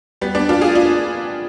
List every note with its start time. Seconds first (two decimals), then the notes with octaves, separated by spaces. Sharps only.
0.21 G3 B3
0.35 B3 D4
0.49 D4 F4
0.61 F4 G#4
0.75 D4 F4